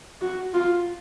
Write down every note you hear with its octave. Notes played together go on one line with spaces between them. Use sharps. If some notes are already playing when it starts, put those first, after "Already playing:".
F#4
F4